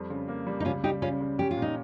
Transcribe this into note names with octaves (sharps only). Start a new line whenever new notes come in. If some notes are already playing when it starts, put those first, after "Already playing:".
Already playing: F2 G3
C#3
A#3
G3
D#4
C#2 C#4 F4
G3 D#4 G4
C#3 C#4 F4
C#3
C#4 G4
F4
A#2
D#4